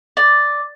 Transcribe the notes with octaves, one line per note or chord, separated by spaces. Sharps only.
D5